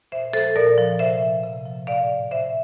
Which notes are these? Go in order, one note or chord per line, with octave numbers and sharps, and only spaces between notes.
A#2 C5 E5
F3 A4 C5
A#2 A#4 D5
F3
C3 C5 E5
F3
C3
F3
A2 D5 F5
F3
A2 C5 E5